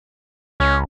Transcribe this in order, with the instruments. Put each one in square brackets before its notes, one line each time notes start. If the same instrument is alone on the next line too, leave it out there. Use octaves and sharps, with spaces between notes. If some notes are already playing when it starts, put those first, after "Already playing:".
[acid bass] C#2 [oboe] C#4